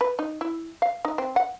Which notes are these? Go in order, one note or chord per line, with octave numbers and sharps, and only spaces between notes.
B4
D#4
E4
F5
D#4
C4
F#5